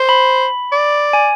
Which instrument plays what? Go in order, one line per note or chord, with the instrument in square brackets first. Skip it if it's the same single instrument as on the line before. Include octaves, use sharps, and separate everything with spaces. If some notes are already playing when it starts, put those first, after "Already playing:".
Already playing: [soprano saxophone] C5
[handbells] B5
[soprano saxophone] D5
[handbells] G#5